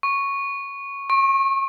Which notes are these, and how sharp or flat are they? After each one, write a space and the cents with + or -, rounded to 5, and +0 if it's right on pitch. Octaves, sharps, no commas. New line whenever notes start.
C#6 -5
C#6 -35